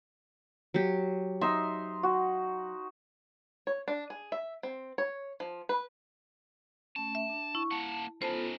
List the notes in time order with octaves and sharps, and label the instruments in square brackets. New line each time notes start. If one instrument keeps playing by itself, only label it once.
[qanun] F#3 G4
[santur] D#4 C6 [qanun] E5
[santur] F#4
[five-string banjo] C#5
D4
G#4
E5
C4
C#5
F3
B4
[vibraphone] A3 C#4 [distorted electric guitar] A5
[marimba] E5
[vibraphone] D4
[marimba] E4 [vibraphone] C#6
[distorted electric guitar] A#3 F#5 [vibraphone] A5
[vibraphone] B3 F4 A4 [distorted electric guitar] C#4 D#4 [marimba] C5 A5